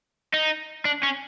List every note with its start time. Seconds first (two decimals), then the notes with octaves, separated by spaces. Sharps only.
0.34 D#4
0.85 D4
1.03 C#4